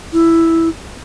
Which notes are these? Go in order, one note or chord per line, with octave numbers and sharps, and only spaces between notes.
E4